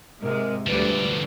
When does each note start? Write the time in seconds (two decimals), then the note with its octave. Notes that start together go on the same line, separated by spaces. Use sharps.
0.22 G#2 C3 G#3 A#4
0.67 D2 D3 F3 G3 B4 D5